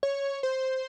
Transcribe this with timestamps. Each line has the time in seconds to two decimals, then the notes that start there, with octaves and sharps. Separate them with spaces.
0.03 C#5
0.43 C5